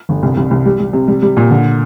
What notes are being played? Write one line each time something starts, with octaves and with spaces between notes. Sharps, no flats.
G1
C2
C2
C2
G3
G3
C3
G3
G3
A#2
D3